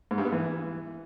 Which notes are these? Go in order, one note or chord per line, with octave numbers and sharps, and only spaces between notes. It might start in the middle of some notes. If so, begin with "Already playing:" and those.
G#2
G2
B3
E3